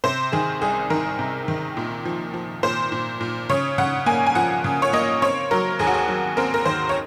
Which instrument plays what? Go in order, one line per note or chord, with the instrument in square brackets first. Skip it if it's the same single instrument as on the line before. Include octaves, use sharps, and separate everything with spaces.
[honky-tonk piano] C3 C5
D#3 G#4
C2 G#4
D#3 A#4
C3
D#3
A#2
F3
F3
A#2 C5
A#2
A#2
C#3 C#5
C#3 F#5
A#3 G#5
G#5
F3 F#5
C#3
C#5
A#3 D#5
C4 C#5
F#3 A#4
D#2 G#4
F#4
G#4
F#3
C4 A#4
A#4
D#3 C5
C#5